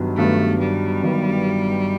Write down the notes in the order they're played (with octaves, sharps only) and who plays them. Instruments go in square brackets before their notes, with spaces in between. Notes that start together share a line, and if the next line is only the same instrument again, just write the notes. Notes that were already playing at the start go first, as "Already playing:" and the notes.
Already playing: [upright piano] G1 G2 D#3 F#3 B3
[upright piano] G1 G2 D#3 F#3 B3 [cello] A3
[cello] G3
[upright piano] G1 G2 D#3 F#3 B3